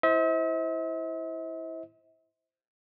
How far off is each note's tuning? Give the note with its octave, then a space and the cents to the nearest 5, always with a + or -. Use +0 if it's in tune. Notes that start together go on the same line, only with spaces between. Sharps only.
E4 +0 C5 +0 E5 -45